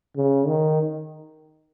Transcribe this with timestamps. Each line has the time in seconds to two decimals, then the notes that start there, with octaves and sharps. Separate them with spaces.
0.16 C#3
0.47 D#3